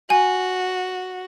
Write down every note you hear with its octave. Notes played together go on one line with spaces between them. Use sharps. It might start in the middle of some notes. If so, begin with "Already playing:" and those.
F#4 G#5